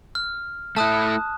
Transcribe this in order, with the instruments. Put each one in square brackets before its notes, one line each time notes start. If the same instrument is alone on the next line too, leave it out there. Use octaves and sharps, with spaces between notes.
[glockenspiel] F6
[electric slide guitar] A3 E4 [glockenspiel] A5 D#6 F#6